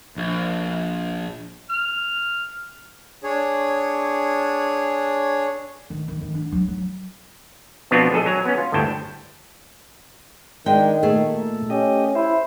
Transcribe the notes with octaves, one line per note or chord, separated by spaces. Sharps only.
A#1
F6
D4 G#4 C#5
D#3
D#3
D#3
D4
F#3
F#3
B2 F3 B3 C4 D4 F4
A#1 G#4 A4 D#5
F#3 G#5 A#5
B3 C#4
F4
G1 D2 A2 G5 A5
D#3 G#3 D4 G5
A#2 A3 G#4
C#4 G4 D#5
E4 C5